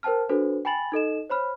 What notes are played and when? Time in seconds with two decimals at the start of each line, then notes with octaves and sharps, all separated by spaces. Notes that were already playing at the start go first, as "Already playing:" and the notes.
0.03 A#4 C5 G5 A5 F6
0.29 D4 F#4 A4 B4 C5
0.65 G5 G#5 B5 A6 F#7
0.92 D#4 A4 D#5 E7
1.30 C5 C#5 B5 F6